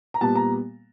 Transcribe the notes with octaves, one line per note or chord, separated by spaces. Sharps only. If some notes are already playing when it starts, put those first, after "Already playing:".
A#5
A#2 G3 B3 A5
A#5